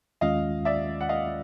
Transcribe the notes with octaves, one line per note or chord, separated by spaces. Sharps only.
D#2 D#3 G#3 C#4 F4 D#5 F5
D5 E5
F#5
D#5 F5